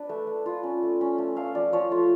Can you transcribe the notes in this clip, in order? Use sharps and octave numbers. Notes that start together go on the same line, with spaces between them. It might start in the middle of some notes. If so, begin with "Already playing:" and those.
Already playing: D4 B4 D5
A3
A3
F4
C#4
A3
C#4
A3
A3 F5
F3 D5
F3 C#5
A3 F4